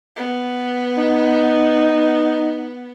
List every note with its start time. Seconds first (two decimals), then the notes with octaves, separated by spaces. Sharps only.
0.16 B3
0.97 D#4